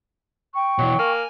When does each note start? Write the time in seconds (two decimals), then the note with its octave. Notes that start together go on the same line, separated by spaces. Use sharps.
0.54 G5 C#6
0.78 B2 E3 F#3
0.99 A#3 G#5